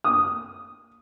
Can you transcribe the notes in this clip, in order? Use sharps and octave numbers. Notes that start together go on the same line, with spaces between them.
D#6